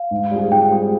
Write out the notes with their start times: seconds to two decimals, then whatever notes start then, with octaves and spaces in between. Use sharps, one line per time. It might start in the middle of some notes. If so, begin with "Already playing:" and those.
Already playing: F5
0.11 G#2
0.31 G3 C4 F4 G#4
0.51 G#2 G5
0.71 G3 C4 F4 G#4